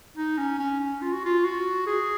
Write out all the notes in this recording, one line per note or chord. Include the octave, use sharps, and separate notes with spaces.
D#4
C#4
C#4
C#4
F4
F#4
F4
F#4
G#4